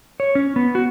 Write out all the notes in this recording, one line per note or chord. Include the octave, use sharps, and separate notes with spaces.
C#5
C#4
B3
F#4